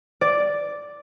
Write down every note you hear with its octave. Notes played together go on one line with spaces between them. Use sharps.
D5